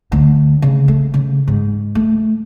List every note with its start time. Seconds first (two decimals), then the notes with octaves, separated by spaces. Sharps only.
0.12 D2
0.62 C#3
0.88 A3
1.14 C#3
1.48 G#2
1.95 A3